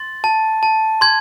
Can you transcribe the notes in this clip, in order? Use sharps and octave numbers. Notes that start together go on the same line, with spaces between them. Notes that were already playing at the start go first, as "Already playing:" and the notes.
Already playing: C6 A6
A5
A5
C6 G#6